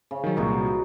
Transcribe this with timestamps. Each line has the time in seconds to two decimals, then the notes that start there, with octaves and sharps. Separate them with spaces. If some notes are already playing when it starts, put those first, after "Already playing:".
0.11 C#3
0.24 D#3 F#3
0.37 C2 A#2 D#4 F#4 B4